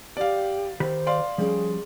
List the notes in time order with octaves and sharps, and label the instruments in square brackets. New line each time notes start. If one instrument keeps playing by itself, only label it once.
[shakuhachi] G4 [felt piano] D5 F5
[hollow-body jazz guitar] D#3 G4 B5 [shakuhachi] C5
[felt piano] D5 F5 C6
[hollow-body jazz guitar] F3 G3 C#4 [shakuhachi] G#4